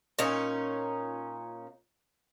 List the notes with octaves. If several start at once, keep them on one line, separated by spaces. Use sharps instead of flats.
A#2 C#4 D#4